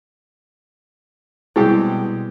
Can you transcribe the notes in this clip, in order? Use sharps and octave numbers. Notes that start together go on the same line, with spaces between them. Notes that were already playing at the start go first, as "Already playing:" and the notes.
B2 G3 G#3 C4 E4 G4 G#4 G5